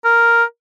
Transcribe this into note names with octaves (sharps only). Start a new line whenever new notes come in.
A#4